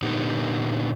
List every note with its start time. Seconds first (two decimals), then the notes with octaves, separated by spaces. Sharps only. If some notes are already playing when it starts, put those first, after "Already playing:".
0.02 A#2 D3 B3 D#4 G4